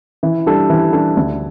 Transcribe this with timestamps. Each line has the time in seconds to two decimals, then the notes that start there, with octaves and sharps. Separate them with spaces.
0.23 E3
0.46 G3 D4 A4
0.70 E3
0.93 G3 D4 A4
1.17 D2